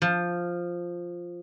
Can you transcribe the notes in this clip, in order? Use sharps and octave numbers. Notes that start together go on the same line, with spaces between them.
F3